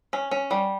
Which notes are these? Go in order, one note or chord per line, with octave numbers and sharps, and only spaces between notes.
C#4
C#4
G3